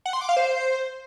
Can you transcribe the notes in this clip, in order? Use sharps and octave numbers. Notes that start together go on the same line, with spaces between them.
F#5
C6
D6
F5
C5